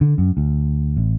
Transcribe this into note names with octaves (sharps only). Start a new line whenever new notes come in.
D3
F#2
D2
A1